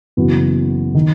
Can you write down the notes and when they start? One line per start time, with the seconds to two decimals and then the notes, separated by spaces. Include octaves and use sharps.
0.17 F#1 F#2 E3 B3 F#4
0.95 D#3